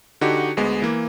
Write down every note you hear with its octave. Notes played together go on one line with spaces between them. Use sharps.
D3 D#4 F#4 G4
D2 G#3 B3
E3 A#3